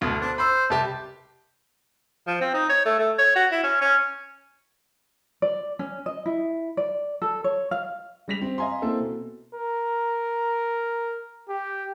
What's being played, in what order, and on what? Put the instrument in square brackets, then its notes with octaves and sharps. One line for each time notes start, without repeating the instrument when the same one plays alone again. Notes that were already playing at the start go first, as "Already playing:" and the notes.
[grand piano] D2 B2 C6
[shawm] D4 [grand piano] C5
[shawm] C5 [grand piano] B5 E6
[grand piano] C2 G4 [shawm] A5
[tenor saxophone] F3
C4
D#4
C#5
A3
A3
C#5
F#4
E4
C#4
C#4
[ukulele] D5
C#4
D#5
E4
D5
A4
C#5
F5
[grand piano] G3 G#3 A#6 B6 F7
C4
D#5 F5 G#5 A#5 C6
A#3 C4 E4 A4
B2
[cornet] A#4
G4